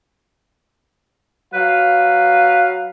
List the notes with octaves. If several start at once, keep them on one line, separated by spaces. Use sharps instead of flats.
F#3 B4 F5